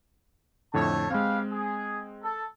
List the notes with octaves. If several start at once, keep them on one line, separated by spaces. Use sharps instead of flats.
F2 A2 D3 A3 C#5 A5
G#3 C4 G4 B4 F5
G#4
A4